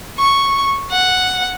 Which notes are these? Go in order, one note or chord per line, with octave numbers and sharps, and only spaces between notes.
C#6
F#5